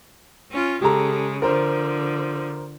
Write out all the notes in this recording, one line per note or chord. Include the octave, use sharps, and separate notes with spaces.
C#4 F4
C#3 G#3 G4 A4 A#5
D3 F3 A#4 C5